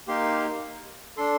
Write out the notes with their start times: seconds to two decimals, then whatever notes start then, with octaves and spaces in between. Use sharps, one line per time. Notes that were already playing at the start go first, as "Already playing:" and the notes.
0.08 A#3 D#4 G4 C6
1.17 D4 A4 C6